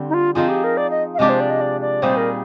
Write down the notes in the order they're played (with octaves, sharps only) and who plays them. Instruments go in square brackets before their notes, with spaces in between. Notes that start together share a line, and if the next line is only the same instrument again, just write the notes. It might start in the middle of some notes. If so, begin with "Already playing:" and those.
Already playing: [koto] D3 G3 C4
[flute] D#4
F4
[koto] F3 C4 D#4 G#4 [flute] F4
[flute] G4
A#4
D5
D#5
F5
[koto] C3 F3 G#3 D4 G4 [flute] D#5
[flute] C5
D5
D#5
D5
D5
[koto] A#2 G3 C4 D#4 G#4 [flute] C5
[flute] A#4